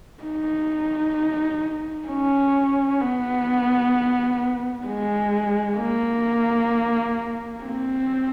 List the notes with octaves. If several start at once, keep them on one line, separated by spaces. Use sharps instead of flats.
D#4
C#4
B3
G#3
A#3
C4